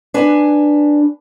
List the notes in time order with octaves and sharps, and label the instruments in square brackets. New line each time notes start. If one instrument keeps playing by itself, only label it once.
[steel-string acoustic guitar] D4 B4 G#5